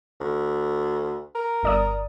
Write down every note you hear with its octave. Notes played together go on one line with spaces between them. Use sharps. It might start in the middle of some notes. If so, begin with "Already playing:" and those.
D2
A#4
G1 D5 D#6